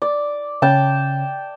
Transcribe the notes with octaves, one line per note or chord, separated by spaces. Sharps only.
D5
C#3 G5 A5